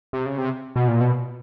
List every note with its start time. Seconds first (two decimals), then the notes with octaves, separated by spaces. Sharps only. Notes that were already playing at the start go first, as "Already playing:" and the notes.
0.13 C3
0.26 C#3
0.38 C3
0.76 B2
0.88 A#2
1.01 B2